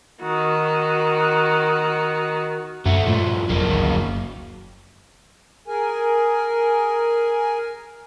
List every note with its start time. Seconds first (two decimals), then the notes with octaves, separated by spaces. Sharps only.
0.22 D#3 F#4
2.85 F#2 A3 F#4
3.06 G2 A#2 F3 A3
3.50 G1 F2 F#3 A#3
3.67 G1 C#2 D#3
3.93 F#1
5.68 G#4 A#4 G#5